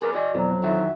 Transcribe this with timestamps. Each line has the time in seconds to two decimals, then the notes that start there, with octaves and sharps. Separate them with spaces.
0.02 G#4 A#4 B4 D5
0.15 F#4 D5 D#5 G#5
0.35 F2 B2 E3 F#3
0.64 D#3 E3 F#4 E5